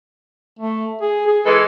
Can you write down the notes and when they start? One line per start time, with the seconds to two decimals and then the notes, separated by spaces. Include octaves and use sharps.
0.59 A3
1.01 G#4
1.26 G#4
1.46 E3 G#3 A4 B4